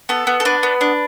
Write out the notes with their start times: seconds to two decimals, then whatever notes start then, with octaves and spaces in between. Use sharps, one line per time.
0.09 B3 A4
0.27 B3
0.40 A4
0.45 D4 B4
0.63 B3
0.81 D4